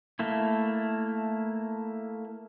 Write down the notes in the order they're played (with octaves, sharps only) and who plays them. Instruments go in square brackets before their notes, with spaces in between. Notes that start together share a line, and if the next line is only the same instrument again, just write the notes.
[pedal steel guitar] A3 A#3 E4